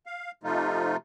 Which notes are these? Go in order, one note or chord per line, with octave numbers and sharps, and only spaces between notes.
F5
C3 F3 A3 D#4 F4